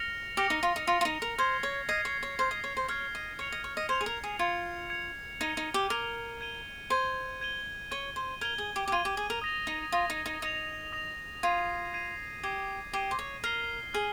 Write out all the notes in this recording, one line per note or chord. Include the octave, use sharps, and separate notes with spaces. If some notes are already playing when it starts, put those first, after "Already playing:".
Already playing: F6 A#6 C#7 F7
G4 F6 A#6 C#7 F7
D#4
F4
D#4
F4 F6 A#6 C#7 F7
F4
D#4
A#4
C5 F6 G#6 C7
C#5
D#5 F6 G#6 C7
C#5
C#5
C5 F6 G#6 C7
D#5
C#5
C5
C#5 F6 G#6 C7
D#5
C#5 G#6 C#7 F7
D#5
C#5
D#5
C5 G#6 C#7 F7
G#4
A#4
G#4
F4 G#6 C#7 F7
G#6 C#7 F7
D#4 G#6 D#7 G7
D#4
G4
A#4 G#6 D#7 G7
G#6 D#7 G7
C5 G#6 D#7 G7
G#6 D#7 G7
C#5 G#6 D#7 G7
C5
A#4 G#6 D#7 G7
G#4
G4
G4
F4 G#6 D#7 G7
G4
G#4
A#4
D#6 A#6 F7
D#4
F4 D#6 A#6 F7
D#4
D#4
D#4 D#6 A#6 F7
D#6 A#6 F7
F4 G#6 C7 D#7
G#6 C7 D#7
G4 G#6 C7 D#7
G4 G#6 C7 D#7
C5
C#5
A#4 F6 C7 G7
G#4 F6 C7 G7